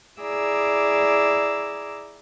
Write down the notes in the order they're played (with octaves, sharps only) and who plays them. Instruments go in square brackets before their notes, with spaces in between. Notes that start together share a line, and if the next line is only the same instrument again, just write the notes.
[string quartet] E4 G#4 D5 A#5 D6 E6